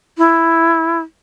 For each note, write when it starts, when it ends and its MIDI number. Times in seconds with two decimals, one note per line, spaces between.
0.18 0.98 64